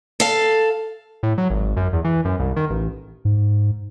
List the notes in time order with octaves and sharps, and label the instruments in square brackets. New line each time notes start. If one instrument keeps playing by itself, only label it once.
[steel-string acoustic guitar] A4 F5
[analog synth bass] A2
F#3
G#1
F#2
E2
E3
F#2
C2
D#3
A1
[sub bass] G#2